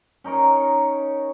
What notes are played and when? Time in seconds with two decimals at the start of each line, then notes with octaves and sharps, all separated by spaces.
0.24 C#4 D#4 A#4 C#5